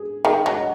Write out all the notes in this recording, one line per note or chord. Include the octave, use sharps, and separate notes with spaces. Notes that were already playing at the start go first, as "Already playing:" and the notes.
Already playing: G#4
D#3 G#4
F#3 D#5
C#5